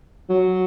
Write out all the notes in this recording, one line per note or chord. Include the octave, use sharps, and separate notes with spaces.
F#3